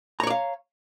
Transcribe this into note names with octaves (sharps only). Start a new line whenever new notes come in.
C#5 D5 F5 A#5